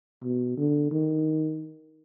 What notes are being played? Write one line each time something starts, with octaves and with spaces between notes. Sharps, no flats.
B2
D3
D#3